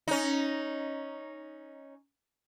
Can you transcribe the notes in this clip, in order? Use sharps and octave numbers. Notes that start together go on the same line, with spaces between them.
C#4 D#4